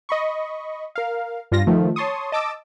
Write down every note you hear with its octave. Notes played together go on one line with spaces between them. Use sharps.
D#5 B5 C#6
A#4 F5
G2 F4 A#6
D#3 F3 A3
C#5 A5 C6 C#6 D#6
D#5 A5 D6 E6 A6